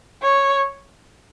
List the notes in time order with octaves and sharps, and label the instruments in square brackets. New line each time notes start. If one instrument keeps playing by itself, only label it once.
[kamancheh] C#5